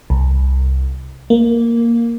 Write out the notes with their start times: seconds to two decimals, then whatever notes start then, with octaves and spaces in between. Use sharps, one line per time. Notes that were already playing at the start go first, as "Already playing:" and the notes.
0.10 C2
1.30 A#3